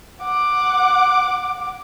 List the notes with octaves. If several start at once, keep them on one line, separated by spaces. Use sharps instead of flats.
F#5 D6